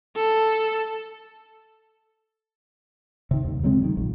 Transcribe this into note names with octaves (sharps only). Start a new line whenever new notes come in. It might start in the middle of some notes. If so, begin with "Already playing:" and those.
A4
C3 D#3
D#2
C#3 F#3 G#3 C4
D#3
A#1